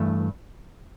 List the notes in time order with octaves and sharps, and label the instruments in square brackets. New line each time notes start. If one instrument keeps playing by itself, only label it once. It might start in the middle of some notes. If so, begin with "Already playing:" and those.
Already playing: [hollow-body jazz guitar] G2 E3 A3